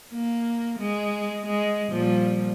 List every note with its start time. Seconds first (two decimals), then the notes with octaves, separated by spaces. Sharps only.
0.13 A#3
0.79 G#3
1.46 G#3
1.90 A#2 F3 G3